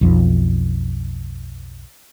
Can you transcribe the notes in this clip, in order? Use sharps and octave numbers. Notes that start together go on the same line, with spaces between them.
B1 F2